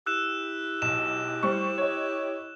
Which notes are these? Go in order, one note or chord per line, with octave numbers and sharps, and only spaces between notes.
E4 G4 E6 F#6 E7
B1 E7
G3 C5 C#6
C#5 D#5